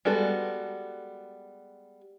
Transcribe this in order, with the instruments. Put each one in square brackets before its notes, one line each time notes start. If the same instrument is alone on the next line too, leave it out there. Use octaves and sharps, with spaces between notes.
[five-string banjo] G3 G#3 B3 F#4 A4